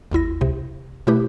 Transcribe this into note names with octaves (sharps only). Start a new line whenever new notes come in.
G#1 D#2 E4 A#6
C#2 C3
B2 A3 E4 G4 B4